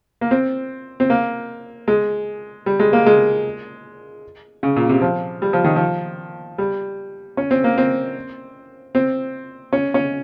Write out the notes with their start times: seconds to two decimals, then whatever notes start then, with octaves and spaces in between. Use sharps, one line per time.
0.21 A#3
0.31 C4
1.00 C4
1.10 A#3
1.88 G#3
2.66 G3
2.80 G#3
2.93 A#3
3.06 G#3
4.63 C#3
4.76 A#2
4.89 C3
5.01 F3
5.42 G3
5.53 F3
5.64 D#3
5.76 F3
6.58 G3
7.37 C#4
7.51 C4
7.64 A#3
7.78 C4
8.95 C4
9.73 C#4
9.94 C#4